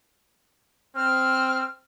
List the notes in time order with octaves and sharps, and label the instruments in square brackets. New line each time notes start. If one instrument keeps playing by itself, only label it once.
[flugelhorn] C4 [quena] F6